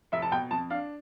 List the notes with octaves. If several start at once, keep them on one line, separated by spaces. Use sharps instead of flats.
F1 E5
A5
B2 G5
F2 A5
D4 F5